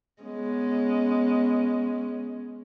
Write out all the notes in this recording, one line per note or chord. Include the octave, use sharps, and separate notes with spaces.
G#3 B3 C#4